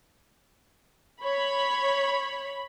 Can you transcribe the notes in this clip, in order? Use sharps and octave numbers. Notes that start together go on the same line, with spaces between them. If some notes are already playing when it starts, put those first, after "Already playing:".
C#5 B5